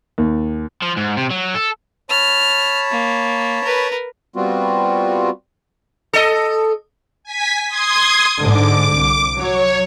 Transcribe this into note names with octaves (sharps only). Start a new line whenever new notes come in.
D#2
F3
G#2
C3
F#3
A4
C#5 A5 B5 F6
A#3
A#4 B4
G3 B3 C4 F4 F#4
A4 D#5
G#5 B6
C6 D#6 G#6
G#2 D3 D6
C2
F#3 C#5